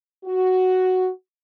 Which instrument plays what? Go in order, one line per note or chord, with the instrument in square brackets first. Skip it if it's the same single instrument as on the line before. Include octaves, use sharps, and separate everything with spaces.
[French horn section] F#4